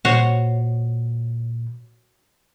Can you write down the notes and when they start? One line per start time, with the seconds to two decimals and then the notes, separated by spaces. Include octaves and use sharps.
0.05 A#2 F#4 C5 C#5